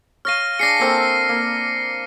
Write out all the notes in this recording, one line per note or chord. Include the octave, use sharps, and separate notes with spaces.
C#5 F5 F6 A#6 D#7
D4 G#4 A#6 C7 C#7
A#3 C4 A4
A#3